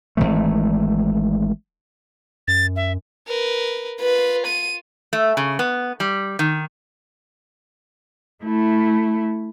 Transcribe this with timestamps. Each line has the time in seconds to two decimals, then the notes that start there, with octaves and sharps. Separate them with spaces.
0.17 G#1 E2 E3 A3
2.48 F#2 A6
2.76 E5
3.27 A#4 B4
4.00 F4 B4
4.47 D#7
5.13 A3
5.37 C#3
5.59 B3
6.00 G3
6.39 D#3
8.44 A3 E4